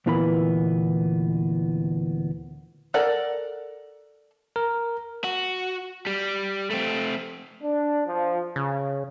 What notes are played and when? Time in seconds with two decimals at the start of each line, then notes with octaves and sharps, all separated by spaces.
0.06 D2 A#2 E3 A#3 B3 B5
2.94 A4 A#4 D5 F#5
4.56 A#4
5.24 F#4
6.06 G3
6.70 A3 C4
7.62 D4
8.07 F3
8.56 C#3